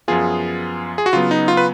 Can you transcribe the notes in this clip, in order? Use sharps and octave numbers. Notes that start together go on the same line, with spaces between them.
F#2 F3 B3 F4 G#4
G#4
F#4
C#3 F#3 B3 F4
D#4
F4
B4